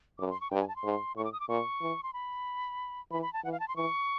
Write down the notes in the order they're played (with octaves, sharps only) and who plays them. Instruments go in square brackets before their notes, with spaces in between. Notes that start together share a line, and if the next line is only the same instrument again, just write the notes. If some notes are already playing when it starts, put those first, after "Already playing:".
[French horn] F#2 [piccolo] D6
[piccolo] C6
C#6
[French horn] G2 [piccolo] G5
[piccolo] G#5
A5
C6
[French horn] G#2
[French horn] A2 [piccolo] C#6
[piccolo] D6
D#6
D6
[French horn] A#2 [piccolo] C#6
[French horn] E3
[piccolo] C6
B5
[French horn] E3 [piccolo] B5
[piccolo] B5
A5
[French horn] E3 [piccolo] F#5
[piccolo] F5
A5
C6
[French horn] E3 [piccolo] C#6